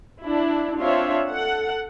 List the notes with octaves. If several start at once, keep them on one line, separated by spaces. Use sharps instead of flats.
D4 E4
C4 D4 F4 C#5 E5
A4 F#5